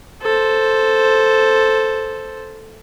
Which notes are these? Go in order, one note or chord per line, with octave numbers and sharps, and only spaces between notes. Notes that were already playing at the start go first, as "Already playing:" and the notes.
A4 C5